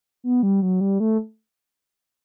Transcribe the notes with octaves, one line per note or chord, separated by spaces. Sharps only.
B3
G3
F#3
G3
A3